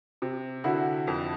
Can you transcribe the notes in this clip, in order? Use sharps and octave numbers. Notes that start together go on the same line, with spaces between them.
C3
D3 E4 F#4
F2